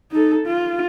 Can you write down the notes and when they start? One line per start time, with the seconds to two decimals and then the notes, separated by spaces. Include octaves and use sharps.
0.12 D#4 A4
0.47 F4